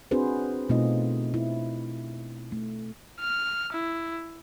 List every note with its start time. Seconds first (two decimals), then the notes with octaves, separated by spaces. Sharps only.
0.11 C4 D4 F#4 G#4 B4 C5
0.69 B2 A3 C4 D#4 F4 D#5
1.34 E4
2.52 A3
3.20 F6
3.73 E4